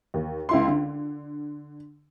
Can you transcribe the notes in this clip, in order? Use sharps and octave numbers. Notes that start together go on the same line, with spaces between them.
D#2
C#2 E4 C6
D3